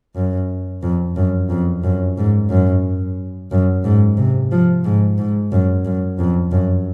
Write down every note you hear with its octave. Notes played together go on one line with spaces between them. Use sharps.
F#2
F2
F#2
F2
F#2
G#2
F#2
F#2
G#2
C3
F3
G#2
G#2
F#2
F#2
F2
F#2